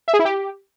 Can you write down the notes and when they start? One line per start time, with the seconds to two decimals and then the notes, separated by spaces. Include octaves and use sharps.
0.08 E5
0.14 G#4
0.19 E4
0.25 G4